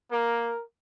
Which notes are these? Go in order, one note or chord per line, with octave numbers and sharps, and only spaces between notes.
A#3 A#4